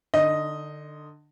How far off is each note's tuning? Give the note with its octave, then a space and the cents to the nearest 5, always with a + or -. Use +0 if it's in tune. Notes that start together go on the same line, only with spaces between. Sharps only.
D3 +25 D#4 +0 D#5 +0